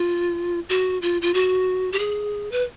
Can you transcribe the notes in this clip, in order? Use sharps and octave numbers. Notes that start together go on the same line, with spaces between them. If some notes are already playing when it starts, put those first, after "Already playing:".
Already playing: F4
F#4
F4
F4
F#4
G4
G#4
B4